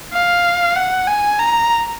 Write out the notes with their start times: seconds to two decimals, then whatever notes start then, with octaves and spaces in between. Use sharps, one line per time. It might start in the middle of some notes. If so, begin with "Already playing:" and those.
0.13 F5
0.76 F#5
1.08 G#5
1.39 A#5